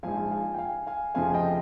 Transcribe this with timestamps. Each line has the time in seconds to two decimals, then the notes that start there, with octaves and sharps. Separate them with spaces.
0.03 A#1 G#2 F3 F5 G#5
0.31 F5 G#5
0.54 G5
0.58 F5 G#5
0.87 F5 G#5
1.15 F1 F2 C#3 F3 F5 G#5
1.34 D#5 G5